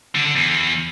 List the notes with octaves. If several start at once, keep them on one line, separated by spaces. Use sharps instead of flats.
D3
D3
E2